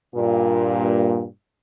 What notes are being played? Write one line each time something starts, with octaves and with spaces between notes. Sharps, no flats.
G2 A#2